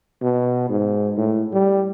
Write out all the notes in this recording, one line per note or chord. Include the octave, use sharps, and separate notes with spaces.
B2
G#2
A2
G3